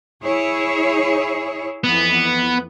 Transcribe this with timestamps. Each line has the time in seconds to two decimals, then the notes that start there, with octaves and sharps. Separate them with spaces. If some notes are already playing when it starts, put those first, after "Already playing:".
0.23 E4 G#4 C#5
1.84 F2 E3 B3